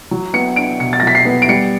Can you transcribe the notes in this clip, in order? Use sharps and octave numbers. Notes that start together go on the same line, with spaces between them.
F#3
B3 C#7
D4 D7
B2 C#7
A6
A#6
F#3 B6
C7
B3
D7
G3 C#7